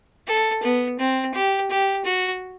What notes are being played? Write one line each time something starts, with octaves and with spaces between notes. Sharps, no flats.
A4
B3
C4
G4
G4
F#4